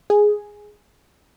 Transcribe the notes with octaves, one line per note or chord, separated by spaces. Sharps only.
G#4